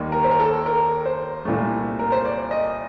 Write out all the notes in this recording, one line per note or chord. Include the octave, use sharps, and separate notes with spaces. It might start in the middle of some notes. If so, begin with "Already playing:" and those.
Already playing: D#2 D#3 G3 A#3
A#4
C5
A#4
A4
A#4
C5
C2 A#2 A3
A#4
C5
D5
D#5